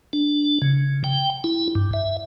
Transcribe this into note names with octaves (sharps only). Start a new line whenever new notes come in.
D4
C#3
G5
E4
G2
E5